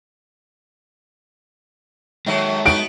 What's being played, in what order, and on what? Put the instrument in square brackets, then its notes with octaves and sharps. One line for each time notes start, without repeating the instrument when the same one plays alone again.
[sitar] D#3 F#3 [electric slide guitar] G#3 A4 [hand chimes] C#5 E5 G5
[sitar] B3 D#4 F#4 [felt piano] D7